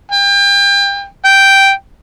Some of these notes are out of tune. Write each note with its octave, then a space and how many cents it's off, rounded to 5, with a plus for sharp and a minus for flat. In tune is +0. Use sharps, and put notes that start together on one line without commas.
G5 +30
G5 -5